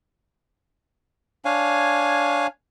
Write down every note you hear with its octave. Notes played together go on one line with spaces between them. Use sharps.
D4 C#5 F5 G#5